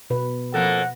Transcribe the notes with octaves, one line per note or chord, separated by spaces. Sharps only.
B2 B4
F2 A#3 A4 F#5